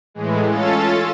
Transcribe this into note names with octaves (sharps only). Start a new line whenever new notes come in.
A2 E3 G#3
C#4 F4 A4 A6